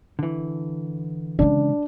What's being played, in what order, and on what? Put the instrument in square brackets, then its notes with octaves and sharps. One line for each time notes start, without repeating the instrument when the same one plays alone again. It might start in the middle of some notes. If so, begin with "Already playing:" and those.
[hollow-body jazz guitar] D3 E3
[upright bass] C#3 G#3 [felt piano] D4